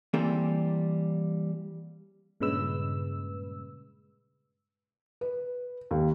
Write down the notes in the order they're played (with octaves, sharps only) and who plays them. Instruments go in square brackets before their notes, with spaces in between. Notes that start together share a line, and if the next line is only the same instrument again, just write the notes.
[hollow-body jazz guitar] E3 G3 A#3 C4 A4
[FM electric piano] G2 A#2 C#3 G#3 B4 E6
[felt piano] B4
D#2